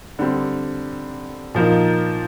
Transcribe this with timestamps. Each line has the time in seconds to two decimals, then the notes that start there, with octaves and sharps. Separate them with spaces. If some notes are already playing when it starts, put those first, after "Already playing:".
0.19 D3 G3 C4
1.55 A#2 F3 A#3 D#4